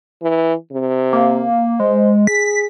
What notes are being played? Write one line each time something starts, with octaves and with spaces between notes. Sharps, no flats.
E3
C3
A#3
G#3 C5
G#4 B6